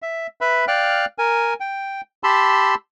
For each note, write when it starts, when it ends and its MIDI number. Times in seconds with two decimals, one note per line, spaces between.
0.02 0.27 76
0.41 0.65 71
0.41 0.65 76
0.41 0.65 83
0.68 1.05 74
0.68 1.05 77
0.68 1.05 79
0.68 1.05 89
0.68 1.05 90
1.18 1.54 70
1.18 1.54 80
1.60 2.01 79
2.24 2.75 67
2.24 2.75 81
2.24 2.75 83
2.24 2.75 84
2.24 2.75 88